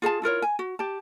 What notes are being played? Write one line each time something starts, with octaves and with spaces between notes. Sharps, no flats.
F4 G#4 F#5 A5
E4 F4 A#4 C#5
G#5
F#4
G4 A5